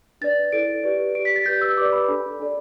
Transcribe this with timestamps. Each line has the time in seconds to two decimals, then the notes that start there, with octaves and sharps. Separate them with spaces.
0.21 D4 B4 D5 A6
0.52 E4 A4 D5 D7
0.84 G4 B4 D5
1.15 G4 D5 D7
1.25 B6
1.36 A6
1.46 G4 B4 D5 G6
1.61 E6
1.77 G4 B4 D5 D6
1.92 B5
2.08 D4 A4 D5
2.40 D4 A4 D5